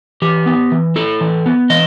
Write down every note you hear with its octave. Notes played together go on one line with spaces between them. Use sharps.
E3 G4
B3
E3
E4 A4
E3
B3
E3 D#5